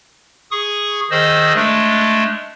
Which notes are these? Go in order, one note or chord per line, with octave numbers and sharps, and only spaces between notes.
G#4 C#6 D#6
D#3 G#4 C5 D#5 E6
G#3 A3 D4